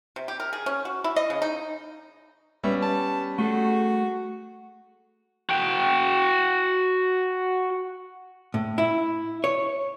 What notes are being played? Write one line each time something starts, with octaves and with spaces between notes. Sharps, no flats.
C3
G4
A#4
G#4
C#4
F#4
E4
D#5
C#3
D#4
G3 B3 C#4 E5
A5
A3 F#4 G#4 A4
F#4 G5
A2
E4
C#5